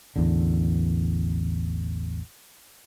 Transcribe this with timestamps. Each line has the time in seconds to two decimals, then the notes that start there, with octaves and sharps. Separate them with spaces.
0.16 A1 E2 D3